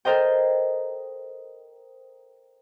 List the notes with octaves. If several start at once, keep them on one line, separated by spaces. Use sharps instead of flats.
A4 A#4 C5 D#5 G5